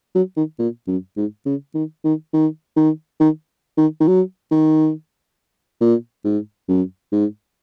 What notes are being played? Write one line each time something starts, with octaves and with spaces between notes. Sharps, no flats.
F#3
D#3
A#2
F#2
G#2
C#3
D#3
D#3
D#3
D#3
D#3
D#3
D#3
F#3
D#3
A#2
G#2
F#2
G#2